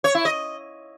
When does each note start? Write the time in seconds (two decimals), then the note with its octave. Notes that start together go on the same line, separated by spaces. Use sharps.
0.04 C#5
0.15 E4
0.25 D#5